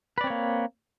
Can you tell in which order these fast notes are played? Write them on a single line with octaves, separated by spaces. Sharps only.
B4 D5 C4 C#5 A#3